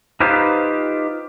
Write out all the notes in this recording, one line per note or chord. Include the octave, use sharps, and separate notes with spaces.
D#4 F4 G4 B4 C5